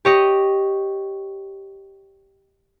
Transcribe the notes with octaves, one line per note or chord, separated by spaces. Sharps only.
G4 C#5 D#5